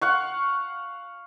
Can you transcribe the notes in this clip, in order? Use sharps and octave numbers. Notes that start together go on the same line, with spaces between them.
F5 F#5 C#6